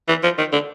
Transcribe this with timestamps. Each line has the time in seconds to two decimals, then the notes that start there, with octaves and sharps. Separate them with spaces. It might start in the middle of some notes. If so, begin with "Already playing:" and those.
0.08 E3
0.23 F3
0.38 D#3
0.52 D3